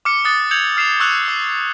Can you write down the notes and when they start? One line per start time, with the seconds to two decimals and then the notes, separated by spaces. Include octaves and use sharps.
0.05 D6 F6 C#7
0.24 D6 D#6 F#6 A6
0.51 E6 G6 G#6 C#7 F7 F#7
0.77 F6 C7 E7 F7
1.00 C#6 E6 F#6 C#7 F7
1.28 D6